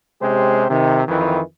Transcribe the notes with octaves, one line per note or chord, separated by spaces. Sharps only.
C3 G#3 C#4 G4 C5
C3 D#3
F2 D#3 E3